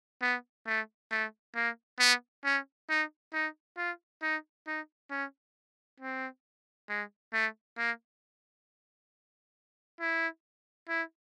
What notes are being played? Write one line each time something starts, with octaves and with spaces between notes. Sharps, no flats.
B3
A3
A3
A#3
B3
C#4
D#4
D#4
F4
D#4
D#4
C#4
C4
G#3
A3
A#3
E4
E4